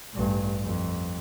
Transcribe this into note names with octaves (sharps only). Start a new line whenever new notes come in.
A1 G2
F2